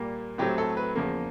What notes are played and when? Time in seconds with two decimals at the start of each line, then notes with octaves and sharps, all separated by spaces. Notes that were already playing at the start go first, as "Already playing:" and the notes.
Already playing: A#2 G3 A#3
0.38 A2 F#3 A3 C4 G4
0.58 A4
0.77 B4
0.96 E2 C#3 F3 A#3